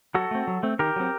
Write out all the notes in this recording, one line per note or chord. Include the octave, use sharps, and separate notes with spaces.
F#3 F#4 A4
A3 C4
F#3
A3 C4
D#3 G4 A#4
F#3 C4